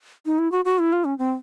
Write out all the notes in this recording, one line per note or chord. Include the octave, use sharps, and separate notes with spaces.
D#4
E4
F#4
F#4
E4
F4
C#4
C4